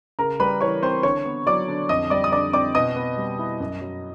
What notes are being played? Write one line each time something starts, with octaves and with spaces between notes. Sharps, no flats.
C#3 A#4 A#5
G3 B4 B5
E3 C#5 C#6
C4 C5 C6
D3 C#5 C#6
B3
F#3 D5 D6
D3
F2 D#5 D#6
G3 D5 D6
D#6
D3 D5 D6
C4 D5 D6
B2 D#5 D#6
B3
G3
E4
F#2
F#3